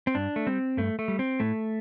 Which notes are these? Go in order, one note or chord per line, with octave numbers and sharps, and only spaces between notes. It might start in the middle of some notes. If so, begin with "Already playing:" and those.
C4
G2 D4
A3
G3 C4
G2 A3
A3
G3
C4
A2 A3